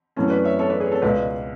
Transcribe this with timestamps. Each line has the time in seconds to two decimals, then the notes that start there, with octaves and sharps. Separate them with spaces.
0.16 F#2 E3 A3 C#4
0.30 B4 D5
0.44 C#5 E5
0.59 A4 C#5
0.69 B4 D5
0.80 G#4 B4
0.91 A4 C#5
1.02 C#2 B2 G#3 B4 D5